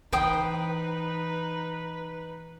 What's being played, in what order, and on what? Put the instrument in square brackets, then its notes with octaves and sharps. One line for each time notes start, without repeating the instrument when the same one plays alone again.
[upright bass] E3 [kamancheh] D#4 B4 [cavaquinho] C5 G5 D#6